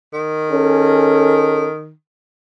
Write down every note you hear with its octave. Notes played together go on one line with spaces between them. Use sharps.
D#3
C#4 G#4 A4